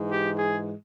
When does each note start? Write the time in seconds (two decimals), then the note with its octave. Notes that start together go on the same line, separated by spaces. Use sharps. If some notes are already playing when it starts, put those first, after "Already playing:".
Already playing: G#2 E3 G#3
0.09 G4
0.38 G#4